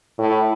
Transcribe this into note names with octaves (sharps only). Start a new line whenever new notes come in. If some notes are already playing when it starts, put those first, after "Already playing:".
A2